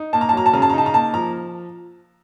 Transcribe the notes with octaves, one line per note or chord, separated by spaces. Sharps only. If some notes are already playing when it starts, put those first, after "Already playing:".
Already playing: D#4
A#3 A5
A#5
A5
F#3 A#5
A5
C#3 A#5
A5
A#5
D#4 A5
A#5
A#3 A5
F3 A#5